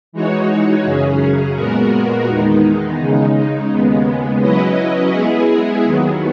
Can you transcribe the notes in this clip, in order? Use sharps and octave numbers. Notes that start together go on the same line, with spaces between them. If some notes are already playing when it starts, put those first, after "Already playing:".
E3 G#3 D#4 F#4 C#5
F#2 C#3 F#3 C#4 G#4
A#2 G#3 B3 F#4 A#4
E2 D#3 G#3 B3 D#4
C#3 G#3 D#4
D#2 C#3 G#3 B3
F#3 C#4 E4 B4 D#5
G#3 B3 E4 G#4
D#2 D#3 F#3 B3